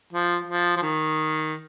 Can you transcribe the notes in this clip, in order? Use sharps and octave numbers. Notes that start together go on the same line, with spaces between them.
F3
F3
F3
D#3